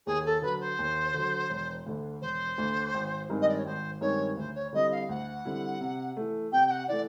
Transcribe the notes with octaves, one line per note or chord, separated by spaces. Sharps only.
D#2 G#4
A4
D3 F#3 B4
C5
D#2
D3 F#3
E1
D2 D3
E1 C5
D2 D3
G#1
G2 D#3 G#3 C4
D#5
D5
C#5
G#1 C5
G2 D#3 G#3 C4 C#5
D2 C5
C#5
D3 G3 C4 E4 D#5
F5
D2 F#5
D3 G3 C4 E4
C3
E3 A3
C3 G5
G5
F#5
E3 A3 D5